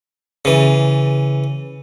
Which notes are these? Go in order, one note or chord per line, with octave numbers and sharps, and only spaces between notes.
C#3 E3